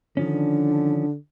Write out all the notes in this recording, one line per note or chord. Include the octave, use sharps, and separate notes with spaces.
D3 D#3 F3 C#4 D4